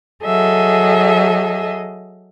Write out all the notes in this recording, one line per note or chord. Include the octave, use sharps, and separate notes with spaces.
F#3 G#4 A4 D#5 E5